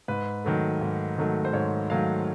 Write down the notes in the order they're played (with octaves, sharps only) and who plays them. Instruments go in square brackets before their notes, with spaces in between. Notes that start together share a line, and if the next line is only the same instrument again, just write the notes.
[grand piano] G#2 B4
D#3 F#3 A3
G#2
D#3 F#3 A3
C5
G#2 C#5
D#3 F#3 A3 F5